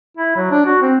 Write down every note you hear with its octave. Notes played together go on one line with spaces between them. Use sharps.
E4
F#3
D4
F#4
C4